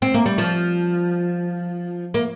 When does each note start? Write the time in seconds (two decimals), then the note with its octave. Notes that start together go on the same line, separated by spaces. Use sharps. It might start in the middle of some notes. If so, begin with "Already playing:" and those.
0.02 C4
0.14 A#3
0.26 G3
0.38 F3
2.14 A#3